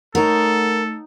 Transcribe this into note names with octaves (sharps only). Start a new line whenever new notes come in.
A3 D#4 A4 A#4 C#5 F#5